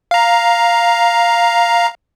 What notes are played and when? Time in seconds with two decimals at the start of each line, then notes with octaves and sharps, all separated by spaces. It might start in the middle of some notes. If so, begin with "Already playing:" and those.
0.11 F5 A#5